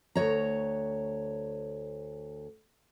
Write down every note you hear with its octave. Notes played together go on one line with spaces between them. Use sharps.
D2 C#5 A#5